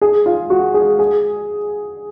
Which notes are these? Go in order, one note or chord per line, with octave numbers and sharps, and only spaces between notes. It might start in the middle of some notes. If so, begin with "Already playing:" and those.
G#4
F4
F#4
G#4
G#4